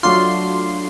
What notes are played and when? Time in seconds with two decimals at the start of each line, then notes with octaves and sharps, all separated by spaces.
0.03 F#3 A3 D4 F4 C6